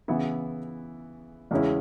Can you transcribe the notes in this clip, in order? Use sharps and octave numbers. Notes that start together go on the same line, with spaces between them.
C#3 E3 B3 E4
E2 C#3 G#3 C#4 E4